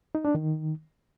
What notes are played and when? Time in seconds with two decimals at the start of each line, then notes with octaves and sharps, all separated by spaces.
0.15 D#4
0.25 D4
0.35 D#3